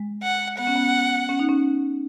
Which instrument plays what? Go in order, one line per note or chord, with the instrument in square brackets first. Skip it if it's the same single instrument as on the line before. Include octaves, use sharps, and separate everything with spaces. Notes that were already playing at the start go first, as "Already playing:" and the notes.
Already playing: [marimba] G#3
[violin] F#5
[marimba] B3 [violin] F#5
[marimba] C#4
B3
C#4
D#4
C#4